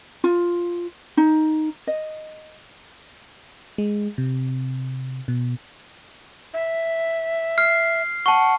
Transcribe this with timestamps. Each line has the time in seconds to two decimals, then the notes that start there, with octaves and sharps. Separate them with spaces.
0.24 F4
1.17 D#4
1.87 D#5
3.78 G#3
4.18 C3
5.28 B2
6.54 E5
7.58 F6 C7
8.26 F#5 A5 C#6